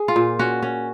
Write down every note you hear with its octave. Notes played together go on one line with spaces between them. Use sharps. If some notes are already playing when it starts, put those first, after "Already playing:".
Already playing: G#4
F4
A#2
C#4 F#4
C#4